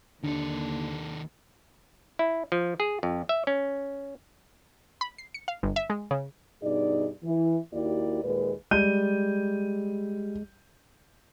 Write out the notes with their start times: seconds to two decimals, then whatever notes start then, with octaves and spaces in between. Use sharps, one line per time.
0.24 D#2 D3 D#3 D4 A4
2.19 E4
2.52 F3
2.80 G#4
3.03 F2
3.29 E5
3.47 C#4
5.01 B5
5.18 C7
5.34 C#7
5.48 F5
5.63 G1
5.76 E5
5.90 G#3
6.11 C#3
6.62 G2 B2 D#4 G#4 D5
7.23 E3
7.73 D#2 A#3 E4 F#4 G4 D5
8.23 D#2 A#2 G#3 B4
8.71 G3 G#3 G6 D#7